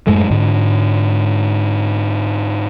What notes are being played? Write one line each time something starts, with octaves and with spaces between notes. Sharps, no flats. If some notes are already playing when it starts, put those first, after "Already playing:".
F#2 A2 G#3 A3
G#2 D3